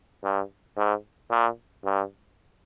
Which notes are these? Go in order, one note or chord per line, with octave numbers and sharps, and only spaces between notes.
G2
G#2
A#2
G2